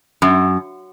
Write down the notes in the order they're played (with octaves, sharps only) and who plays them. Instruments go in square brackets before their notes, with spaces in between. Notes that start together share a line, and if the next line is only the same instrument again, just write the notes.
[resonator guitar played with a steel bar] F#2